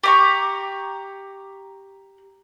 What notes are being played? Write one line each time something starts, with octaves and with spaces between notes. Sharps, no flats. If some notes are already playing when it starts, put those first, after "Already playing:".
G4 A#5 C#6